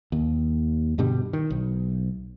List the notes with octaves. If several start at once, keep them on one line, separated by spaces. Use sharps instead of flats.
D#2
G2 B2 D3 G3
D#3
B1